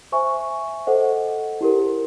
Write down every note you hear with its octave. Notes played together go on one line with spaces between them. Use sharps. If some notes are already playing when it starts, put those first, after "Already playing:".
C5 E5 G#5 C#6
A4 C5 D#5 F#5
E4 G4 A#4